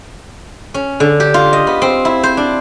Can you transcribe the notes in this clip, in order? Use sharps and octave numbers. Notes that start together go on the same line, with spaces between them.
C#4
D3
G4
F4
D#5
B3
C4
E4
C5
D4